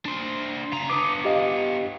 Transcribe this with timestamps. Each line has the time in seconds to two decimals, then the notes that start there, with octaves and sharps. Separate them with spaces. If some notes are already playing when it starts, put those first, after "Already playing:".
0.05 D4 C5
0.73 C#3 A#5
0.90 B3 D4 D6 D#6
1.25 G4 D#5 F5